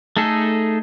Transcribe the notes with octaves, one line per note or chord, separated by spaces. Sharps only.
A3 D#4 G#4 A4